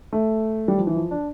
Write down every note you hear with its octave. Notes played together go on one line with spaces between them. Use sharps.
A3
G3
F3
E3
F3
D4